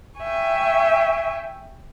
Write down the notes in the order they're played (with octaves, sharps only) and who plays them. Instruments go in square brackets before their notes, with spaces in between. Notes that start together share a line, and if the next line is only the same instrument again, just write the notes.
[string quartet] E5 G5 G#5 C#6